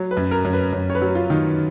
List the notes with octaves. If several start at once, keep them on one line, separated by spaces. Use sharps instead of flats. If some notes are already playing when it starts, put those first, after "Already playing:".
Already playing: F#3
B4
F#2
A#4
F#2
B4
F#2
C#5
B4
F#3
F4
D#3